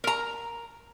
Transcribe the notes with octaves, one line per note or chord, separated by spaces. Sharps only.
A#4 A#5